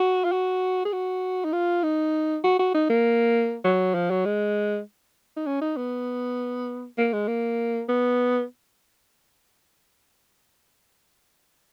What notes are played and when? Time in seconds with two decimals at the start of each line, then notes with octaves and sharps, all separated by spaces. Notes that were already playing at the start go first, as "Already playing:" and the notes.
Already playing: F#4
0.24 F4
0.32 F#4
0.85 G#4
0.93 F#4
1.45 D#4
1.53 F4
1.83 D#4
2.44 F#4
2.59 F#4
2.74 D#4
2.89 A#3
3.65 F#3
3.95 F3
4.10 F#3
4.25 G#3
5.37 D#4
5.46 C#4
5.61 D#4
5.77 B3
6.98 A#3
7.13 G#3
7.28 A#3
7.89 B3